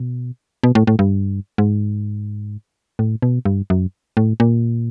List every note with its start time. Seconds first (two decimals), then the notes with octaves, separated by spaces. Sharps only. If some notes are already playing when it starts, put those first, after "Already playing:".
Already playing: B2
0.63 B2
0.75 A2
0.87 A2
0.99 G2
1.58 G#2
2.99 A2
3.22 B2
3.45 G2
3.70 F#2
4.17 A2
4.40 A#2